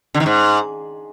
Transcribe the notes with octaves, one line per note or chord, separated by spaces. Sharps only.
D3
D#3
G#2